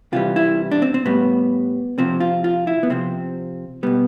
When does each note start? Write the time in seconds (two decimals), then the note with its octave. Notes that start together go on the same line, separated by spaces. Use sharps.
0.13 C3 E3 G3 F4
0.36 E4
0.71 D4
0.82 C4
0.94 C4
1.05 A2 G3 B3
1.98 C3 F3 C4
2.20 F4
2.44 F4
2.67 E4
2.83 B3
2.90 C3 F3 C4
3.83 B2 G3 B3